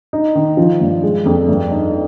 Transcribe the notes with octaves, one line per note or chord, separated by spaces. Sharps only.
D#4
D#3
F3
G2
G#3
F2
G2
D#4